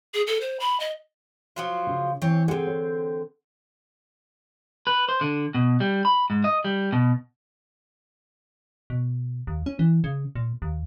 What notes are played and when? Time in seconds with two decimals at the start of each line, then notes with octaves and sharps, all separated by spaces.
0.14 G#4
0.27 A4
0.41 C5
0.60 B5
0.80 D#5
1.56 F3 F#3 F4
1.87 C#3
2.22 E3 C4 C#5
2.48 D3 C4 G#4 F#5
2.67 C#5
4.87 B4
5.09 C5
5.21 D3
5.55 B2
5.80 G3
6.05 B5
6.30 G#2
6.44 D#5
6.64 G3
6.93 B2
8.90 B2
9.47 D#2
9.66 C#4
9.79 E3
10.04 C#3
10.35 A#2
10.62 D#2